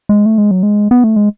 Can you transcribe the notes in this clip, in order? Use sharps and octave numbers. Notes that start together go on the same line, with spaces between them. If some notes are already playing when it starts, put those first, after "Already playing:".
G#3
A3
G#3
F#3
G#3
B3
A3
G#3